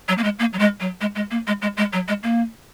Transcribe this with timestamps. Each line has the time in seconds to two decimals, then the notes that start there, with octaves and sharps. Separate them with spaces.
0.08 F#3
0.18 A#3
0.24 G#3
0.39 A#3
0.53 F#3
0.59 G#3
0.80 F#3
1.01 G#3
1.16 G#3
1.31 A#3
1.47 G#3
1.62 G#3
1.77 G#3
1.93 F#3
2.08 G#3
2.23 A#3